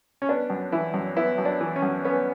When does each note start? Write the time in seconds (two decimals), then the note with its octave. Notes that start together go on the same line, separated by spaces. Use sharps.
0.22 C#4
0.29 B3 D4
0.50 F#2
0.72 E3 E4
0.94 F#2
1.17 B3 E4
1.38 F#2
1.45 D4
1.61 E3
1.76 C#4
1.82 F#2
2.04 B3 C#4